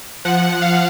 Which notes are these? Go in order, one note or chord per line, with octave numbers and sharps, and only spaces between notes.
F3 F#5
F3
F5
F3